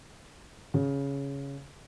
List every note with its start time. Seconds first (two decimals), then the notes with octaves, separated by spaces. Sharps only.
0.74 C#3